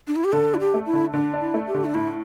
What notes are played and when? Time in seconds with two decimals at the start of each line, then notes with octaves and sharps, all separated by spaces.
0.07 D4
0.16 E4
0.24 G4
0.32 D3 A4
0.53 D4 E4
0.60 G4
0.74 A3
0.87 E4
0.93 D3
1.13 D3 D4
1.33 D4
1.40 E4
1.54 A3
1.67 G4
1.74 D3
1.85 D4
1.94 A2 E4